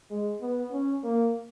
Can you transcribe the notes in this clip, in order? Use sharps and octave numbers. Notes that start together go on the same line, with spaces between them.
G#3
B3
C#4
A#3